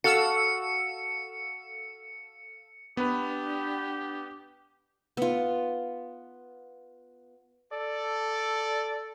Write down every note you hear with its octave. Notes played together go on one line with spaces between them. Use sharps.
F#4 A4 F5 E6 C#7
B3 D4 G4 B4
B3 F4
A4 D5